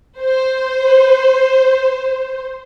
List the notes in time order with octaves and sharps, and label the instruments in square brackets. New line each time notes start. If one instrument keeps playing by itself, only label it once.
[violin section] C5